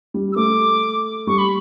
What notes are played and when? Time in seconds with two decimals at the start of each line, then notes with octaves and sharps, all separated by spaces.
0.14 G3
0.33 E6
0.36 A3 D6
1.27 G3 C#6
1.38 B5